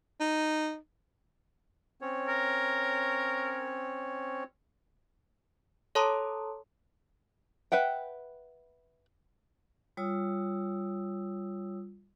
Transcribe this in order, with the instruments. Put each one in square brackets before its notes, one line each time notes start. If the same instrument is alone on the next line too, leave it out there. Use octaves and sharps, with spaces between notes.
[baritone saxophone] D#4
[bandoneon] C4 C#4 C#5
[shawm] A#4
[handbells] A4 C#5 A5 A#5 C6 D#6
[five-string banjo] B4 E5 F#5 G5
[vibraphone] G3 F4 C#5 D#6 E6